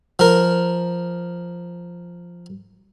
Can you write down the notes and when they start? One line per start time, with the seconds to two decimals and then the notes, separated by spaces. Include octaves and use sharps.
0.19 F3 A#4